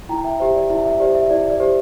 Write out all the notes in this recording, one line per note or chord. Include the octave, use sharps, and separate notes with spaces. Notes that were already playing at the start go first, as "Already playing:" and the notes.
E4 G5 A#5
E5 G5
G4 C5 E5
D5
E4 E5
E5
G4 C5 D5
E5
E4 D5
D5
G4 C5